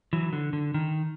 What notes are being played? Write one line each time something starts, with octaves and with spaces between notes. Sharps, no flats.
E3 F#3
D3
D3
D#3